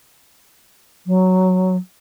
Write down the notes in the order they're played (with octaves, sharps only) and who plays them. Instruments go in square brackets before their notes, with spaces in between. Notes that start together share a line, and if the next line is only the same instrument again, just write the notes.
[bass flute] F#3